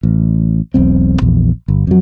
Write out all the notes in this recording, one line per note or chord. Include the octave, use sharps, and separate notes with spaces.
A1
E1 B1 C4
A#1 E2
G1
F2 F#3